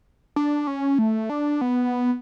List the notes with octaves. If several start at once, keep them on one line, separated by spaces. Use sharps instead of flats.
D4
C#4
A3
D4
B3